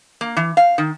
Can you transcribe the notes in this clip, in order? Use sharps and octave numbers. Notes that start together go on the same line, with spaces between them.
A#3
E3
F5
D#3